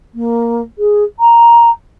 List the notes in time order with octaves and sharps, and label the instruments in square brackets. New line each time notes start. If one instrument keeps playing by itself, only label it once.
[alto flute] A#3
G#4
A#5